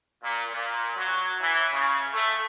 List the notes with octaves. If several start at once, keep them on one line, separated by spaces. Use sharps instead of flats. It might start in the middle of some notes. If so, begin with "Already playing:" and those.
A#2
A#2
F#3
E3
C#3
A3